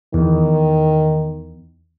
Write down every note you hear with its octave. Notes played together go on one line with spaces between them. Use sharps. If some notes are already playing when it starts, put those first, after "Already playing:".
E2 D#3